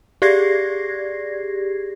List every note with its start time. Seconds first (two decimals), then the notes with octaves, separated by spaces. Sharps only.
0.22 G4 G#4 D5 G#6 A#6 C7